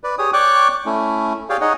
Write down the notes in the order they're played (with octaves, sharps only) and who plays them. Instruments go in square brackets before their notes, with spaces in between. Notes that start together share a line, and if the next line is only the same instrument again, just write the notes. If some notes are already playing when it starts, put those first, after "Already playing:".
[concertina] B4 D5
G4 G#4 C#5 D#6
C#5 D5 G5 C#6 D6 F#6
A3 C#4 E4
G4 G#4 C#5 D5 F5 G5
D#4 G#4 C#5 D#5 F#5